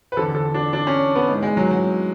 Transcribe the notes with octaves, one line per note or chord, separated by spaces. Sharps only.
B4
E2 D3 A4
A4
D4
D4
C#4
B3
G#2 E3
G#3
F#3
F#3